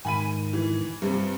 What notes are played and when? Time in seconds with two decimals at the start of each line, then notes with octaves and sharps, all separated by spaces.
0.05 G#2 D#3 G#5 B5 D#7
0.25 D#7
0.53 E3
1.02 G2 C3 C4